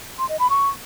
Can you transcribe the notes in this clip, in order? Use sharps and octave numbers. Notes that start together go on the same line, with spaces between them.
C6
D#5
B5
C#6